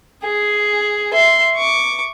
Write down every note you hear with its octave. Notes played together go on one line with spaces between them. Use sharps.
G#4
E5 C6
C#6 D6